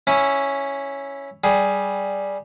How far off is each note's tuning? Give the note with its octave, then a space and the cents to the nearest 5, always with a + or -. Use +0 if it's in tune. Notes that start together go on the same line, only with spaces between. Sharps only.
C#4 +0 E4 +0
G3 +0 G#4 +0